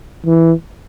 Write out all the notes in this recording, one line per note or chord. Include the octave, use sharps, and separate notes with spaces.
E3